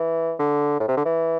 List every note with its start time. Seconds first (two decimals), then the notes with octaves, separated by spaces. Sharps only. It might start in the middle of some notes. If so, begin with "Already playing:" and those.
Already playing: E3
0.40 D3
0.80 A2
0.89 C3
0.97 D3
1.05 E3